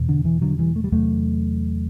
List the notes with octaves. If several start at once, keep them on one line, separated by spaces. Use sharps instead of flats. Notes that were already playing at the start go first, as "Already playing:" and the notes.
Already playing: E2 B2
D3
E3
D3 F#3
E3 G3
A3
G3
E2 C3 F#3 A3